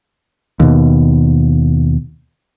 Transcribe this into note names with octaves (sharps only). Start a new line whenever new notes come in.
D#2 B2